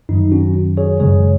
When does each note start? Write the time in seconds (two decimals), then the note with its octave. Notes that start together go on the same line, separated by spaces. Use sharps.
0.09 F#2 D#3 F#3 D#4
0.32 C#4 F#4
0.77 G#4 C#5
1.00 F#2 C#3 G#3 G#4 C#5